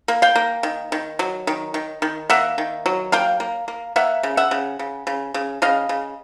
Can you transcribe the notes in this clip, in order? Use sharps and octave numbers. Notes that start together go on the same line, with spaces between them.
A#3
F5 G5
A#3
D#3
D#3
F#3
D#3
D#3
D#3
A#3 E5 F#5
D#3
F#3
A#3 F5 G5
A#3
A#3
A#3 E5 F#5
C#3
E5 F#5
C#3
C#3
C#3
C#3
C#3 D#5 F5
C#3